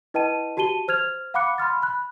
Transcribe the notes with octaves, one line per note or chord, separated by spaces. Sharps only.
E4 B4 D#5 G5 A5 D#7
F#4 G4 A5 D#7 G7
C5 F6 G#6 F7
F5 F#5 B5 D6 F#6 C#7
B5 C6 F6 A6
B5 F#6